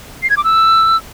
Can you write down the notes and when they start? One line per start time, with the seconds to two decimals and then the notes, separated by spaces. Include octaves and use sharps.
0.23 C7
0.30 G#6
0.37 D6
0.44 E6